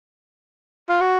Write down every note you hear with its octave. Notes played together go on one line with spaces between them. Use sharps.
F4
F#4